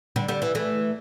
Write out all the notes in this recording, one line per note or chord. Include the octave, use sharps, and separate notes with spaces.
D3 G3
D3 G3
E3
E3 A3